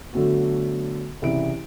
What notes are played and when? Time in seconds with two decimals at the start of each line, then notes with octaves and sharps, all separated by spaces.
0.13 D3 F#3 A3 B3 F#4
1.22 C2 C#3 E3 E4 D7